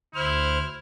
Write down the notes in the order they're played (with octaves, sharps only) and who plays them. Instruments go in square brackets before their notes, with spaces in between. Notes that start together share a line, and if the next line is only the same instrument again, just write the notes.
[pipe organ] D2 C5 F6 [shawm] E4